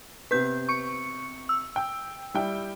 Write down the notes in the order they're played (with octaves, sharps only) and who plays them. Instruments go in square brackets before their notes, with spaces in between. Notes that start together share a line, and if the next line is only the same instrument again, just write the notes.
[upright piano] C3 B3 B6 [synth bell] B4 G6
[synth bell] C#6 C#7
E6
[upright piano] G5
G3 E4 G5